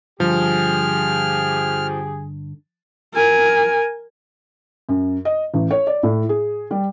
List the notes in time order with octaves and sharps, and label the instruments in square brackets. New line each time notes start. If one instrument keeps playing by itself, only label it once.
[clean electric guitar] G2 D3 [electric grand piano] F3 [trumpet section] G4 G#4 [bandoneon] F6
[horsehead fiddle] A#4 G#5
[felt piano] F#2
D#5
A1
C#5
D5
A2
G#4
G3